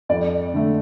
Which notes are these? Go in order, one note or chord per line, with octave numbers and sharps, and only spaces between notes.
F2 D5
D3 A3